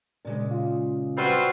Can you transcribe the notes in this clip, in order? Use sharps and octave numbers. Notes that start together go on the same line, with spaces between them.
A#2 C#3 G#3
F4
G3 C4 F4 F#4 B4 C5 F#5